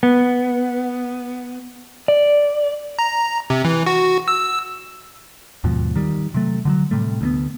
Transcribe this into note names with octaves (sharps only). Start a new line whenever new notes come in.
B3
D5
A#5
C3
E3
F#4
E6
D#2 G#2 B2 F3
D#3 G3
C3 F#3 A3
D3 E3 F#3
A2 C3 G3 A3
D2 G#3 B3